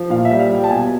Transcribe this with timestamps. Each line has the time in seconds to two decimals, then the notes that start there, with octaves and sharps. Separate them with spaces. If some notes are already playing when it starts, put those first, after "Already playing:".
Already playing: F3
0.10 A#2 F5
0.25 E5
0.31 G3
0.40 F5
0.50 G3 G5
0.64 A5
0.71 B2 G#5